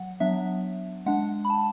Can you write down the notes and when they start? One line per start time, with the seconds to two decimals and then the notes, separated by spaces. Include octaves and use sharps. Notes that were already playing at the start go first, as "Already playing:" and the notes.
Already playing: F#3 F#5
0.20 F#3 B3 D4 E5
1.06 G#3 D4 F#5
1.45 B5
1.50 A5